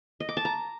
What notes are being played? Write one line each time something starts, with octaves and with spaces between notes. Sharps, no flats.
D#5
D6
A5
A#5